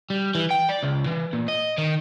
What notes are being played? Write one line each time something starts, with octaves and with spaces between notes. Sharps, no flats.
G3
E3
G5
D5
C#2
E3
A#2
D#5
D#3